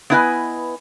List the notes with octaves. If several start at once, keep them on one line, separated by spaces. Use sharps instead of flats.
B3 D4 E4 B4 D#5 G#5